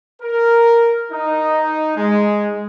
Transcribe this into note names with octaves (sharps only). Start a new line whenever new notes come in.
A#4
D#4
G#3